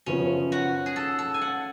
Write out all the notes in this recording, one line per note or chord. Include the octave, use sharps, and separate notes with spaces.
F#2 C#3 F3 B3 C#4
F#4
G#4
A4
A4
G#5
F#5